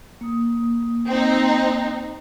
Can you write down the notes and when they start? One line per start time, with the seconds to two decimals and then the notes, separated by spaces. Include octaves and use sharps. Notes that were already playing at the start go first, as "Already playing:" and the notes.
0.21 A#3 D#6
1.07 C4 D#4